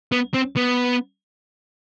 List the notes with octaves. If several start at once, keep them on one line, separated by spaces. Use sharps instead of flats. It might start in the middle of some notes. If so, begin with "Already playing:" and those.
B3
C4
B3